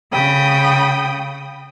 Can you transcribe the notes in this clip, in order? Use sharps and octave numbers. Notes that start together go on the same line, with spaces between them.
C#3 G5 B5 D#6